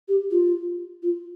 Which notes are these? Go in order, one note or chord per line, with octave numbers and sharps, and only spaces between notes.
G4
F4
F4